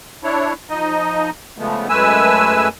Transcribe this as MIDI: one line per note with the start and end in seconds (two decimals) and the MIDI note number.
0.24 0.53 62
0.24 0.53 64
0.24 0.53 73
0.70 1.30 53
0.70 1.30 63
0.70 1.30 75
1.58 1.88 49
1.58 1.88 53
1.58 1.88 56
1.58 1.88 57
1.58 1.88 59
1.89 2.68 42
1.89 2.68 56
1.89 2.68 57
1.89 2.68 71
1.89 2.68 80
1.89 2.68 88